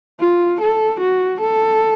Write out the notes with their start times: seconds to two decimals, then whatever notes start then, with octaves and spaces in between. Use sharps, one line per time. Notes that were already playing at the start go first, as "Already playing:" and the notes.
0.20 F4
0.61 A4
1.00 F#4
1.40 A4